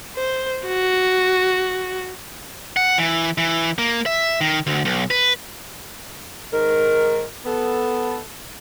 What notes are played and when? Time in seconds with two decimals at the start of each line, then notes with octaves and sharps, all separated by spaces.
0.15 C5
0.66 F#4
2.76 F#5
2.98 E3
3.38 E3
3.78 A#3
4.06 E5
4.41 D#3
4.67 D2
4.85 B1
5.10 B4
6.52 G#2 D#3 A#4
7.45 B3 A4